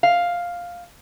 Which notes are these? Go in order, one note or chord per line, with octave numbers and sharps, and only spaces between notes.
F5